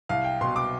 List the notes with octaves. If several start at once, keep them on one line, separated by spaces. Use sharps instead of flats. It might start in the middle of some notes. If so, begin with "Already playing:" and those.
C2 F5
G5
B2 C6
D6